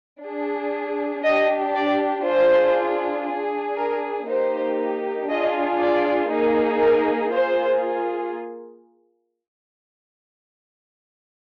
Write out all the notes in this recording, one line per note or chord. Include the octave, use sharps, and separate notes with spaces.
D4 G#4
D4 G4 D#5
D5
D4 F4 G#4 C5
D4 G#4
A#4
A#3 D#4 G4 C5
D4 F4 G#4 D#5
D5
A#3 D#4 G#4
A#4
A#3 F4 G#4 C5